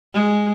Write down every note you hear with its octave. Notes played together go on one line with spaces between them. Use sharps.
G#3